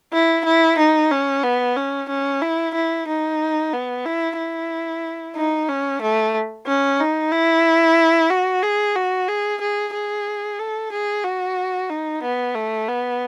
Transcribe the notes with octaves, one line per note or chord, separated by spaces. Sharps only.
E4
E4
D#4
C#4
B3
C#4
C#4
E4
E4
D#4
B3
E4
E4
D#4
C#4
A3
C#4
D#4
E4
F#4
G#4
F#4
G#4
G#4
G#4
A4
G#4
F#4
D#4
B3
A3
B3